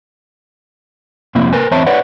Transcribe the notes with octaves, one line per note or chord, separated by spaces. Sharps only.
F2 C3 A#3 E4
A#4 B4 G#5
E2 C4 C#5 E5 A5
B4 C#5 D5 F#5